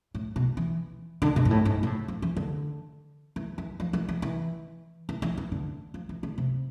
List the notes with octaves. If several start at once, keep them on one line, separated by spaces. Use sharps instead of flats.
A2
B2
E3
D3
B2
G#2
A2
G#2
B2
A2
F3
E3
D3
E3
E3
F3
E3
E3
E3
E3
E3
E3
D3
F3
E3
D3
C3